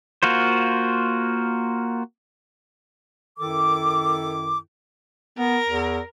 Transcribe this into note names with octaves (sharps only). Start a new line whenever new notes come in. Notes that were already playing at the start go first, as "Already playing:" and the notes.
A#3 F4 F#4 C5
F#2 D#3 E4 A4 D6
B3 A#4
E2